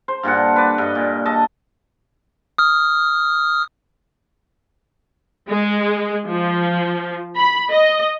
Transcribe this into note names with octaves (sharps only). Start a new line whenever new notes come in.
C5
G2 A#2 D3 F#5
B4 D5
G2 D#5
A#2
A4 D#5 A5
D#6 F6
G#3
F3
B5
D#5